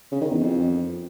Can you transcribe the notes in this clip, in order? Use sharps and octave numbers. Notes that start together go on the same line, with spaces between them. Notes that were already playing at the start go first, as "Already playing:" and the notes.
C#3
D#3
E2
F2